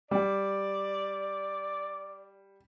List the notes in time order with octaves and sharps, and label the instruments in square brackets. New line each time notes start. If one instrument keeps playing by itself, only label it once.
[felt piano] G3 [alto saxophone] D5